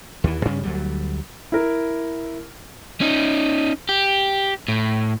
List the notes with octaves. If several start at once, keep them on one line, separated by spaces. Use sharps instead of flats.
D#2 E3
G2 C#3 G3 C#4
D2 F#3 G3
E4 A#4
C#4 D#4
G4
A2